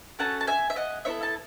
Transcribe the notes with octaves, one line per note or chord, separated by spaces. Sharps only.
A3 C#4 F#4 A4 F#5 A5
A5
E5 G#5
E5
D#5 F#5
B3 E4 A4 C#5 E5
A5